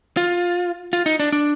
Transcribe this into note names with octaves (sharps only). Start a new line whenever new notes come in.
F4
F4
D#4
D4
D4